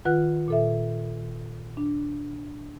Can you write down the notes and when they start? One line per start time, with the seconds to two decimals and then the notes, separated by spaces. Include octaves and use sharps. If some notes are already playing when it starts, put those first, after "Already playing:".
0.05 D#3 F4 B4 F#5 F#6
0.48 A#2 A4 E5
1.77 D4